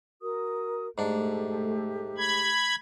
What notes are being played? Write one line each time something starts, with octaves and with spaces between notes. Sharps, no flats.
F#4 A#4 D#6
G#2 A3 D4 G4
B5 G#6